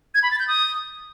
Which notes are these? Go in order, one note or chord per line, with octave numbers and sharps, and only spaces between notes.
G#6
B5
A6
G6
D#6